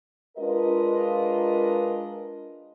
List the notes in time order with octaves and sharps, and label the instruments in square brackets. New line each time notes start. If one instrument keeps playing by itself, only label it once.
[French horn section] G#3 D4 F4 A#4 B4 D#5